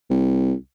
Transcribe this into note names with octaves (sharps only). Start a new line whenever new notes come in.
C2